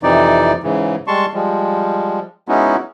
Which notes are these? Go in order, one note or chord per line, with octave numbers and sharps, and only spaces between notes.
F2 C3 E3 D#4 D5
G#2 C#3 E3
G3 G#3 A5 C6 C#6
F3 G3 G#3
G#3 B3 C#4 D#4 E4 F#4